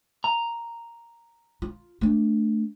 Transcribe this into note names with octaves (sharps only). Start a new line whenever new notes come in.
A#5
F4
A3 D4